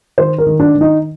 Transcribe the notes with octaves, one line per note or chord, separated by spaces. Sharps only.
D#3 C5
A#4
D#3
D4
D#3
D#4